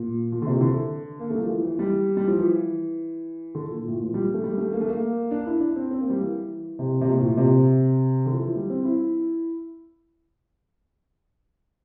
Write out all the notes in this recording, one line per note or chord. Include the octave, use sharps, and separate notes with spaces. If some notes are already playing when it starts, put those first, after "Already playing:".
Already playing: A#2
A#2
D3
C3
E3
D3
A#3
G3 A3
F3
E3
E3
G3
G3
F3
E3
D3
A#2
A2
A#2
F3
G3
A3
G3
A3
A#3
A3
A#3
D4
E4
D4
C4
C4
A#3
G3
E3
C3
C3
A#2
A2
A#2
C3
D3
F3
E3
G3
C4
E4